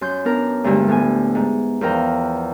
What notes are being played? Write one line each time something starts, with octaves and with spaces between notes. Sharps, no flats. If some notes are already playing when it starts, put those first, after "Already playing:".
F#2 C6 G6
B3 D4 A#4
D2 G2 D3 G#3
A2 B3 G#5
G#2
E2 F3 A#4 G5